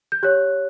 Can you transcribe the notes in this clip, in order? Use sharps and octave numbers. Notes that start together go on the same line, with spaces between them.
G6
G4 C#5 F#6